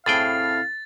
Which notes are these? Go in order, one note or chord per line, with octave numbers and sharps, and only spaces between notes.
A2 C4 E4 G#4 A4 F5 G5 A6